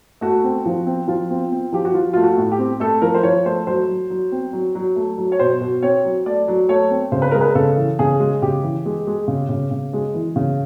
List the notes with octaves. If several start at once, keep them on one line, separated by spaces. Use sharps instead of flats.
A3 F#4
C4
F3
C4
F3 F4
C4
C4
F3 G4
F#4
F3 F4
A3 F4
F#4
A2
G4
C4
A3 A4
F3 A#4
C5
F3 C#5
A3 C5
F#3 C5
F#3
F#3
C4
F#3
F#3
A3
F#3
C#5
B2 C5
B2
C4 C#5
F#3
A3 D5
F#3
A3 C#5
C4
C#3 C5
B4
G#3 A#4
B4
C#3 A4
E3
C#3 G#4
G#3
C#3 G4
E3
G#3
G#3
C#3
C#3
C#3
G#3
E3
C#3